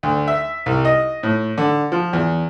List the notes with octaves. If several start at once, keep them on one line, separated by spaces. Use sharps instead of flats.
D2
E5
C2
D#5
A2
D3
F3
E2